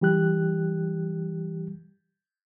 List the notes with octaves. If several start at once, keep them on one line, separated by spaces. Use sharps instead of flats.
E3 G3 G4 F#6